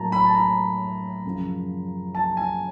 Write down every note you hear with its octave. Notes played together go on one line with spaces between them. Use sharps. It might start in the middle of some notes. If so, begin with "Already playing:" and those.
Already playing: A2 F#3 A#3 A5 A#5
B5
A5
A#5
F#2 C#3 F3
A5
G#5